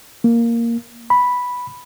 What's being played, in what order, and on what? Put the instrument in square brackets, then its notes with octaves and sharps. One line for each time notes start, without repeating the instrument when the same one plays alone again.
[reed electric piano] A#3
B5